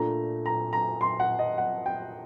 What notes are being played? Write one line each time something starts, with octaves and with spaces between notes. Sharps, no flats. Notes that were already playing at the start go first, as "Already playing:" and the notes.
Already playing: A#2 A3 D4 A#5
A#5
A#5
C6
F#5
D#5
F#5
G5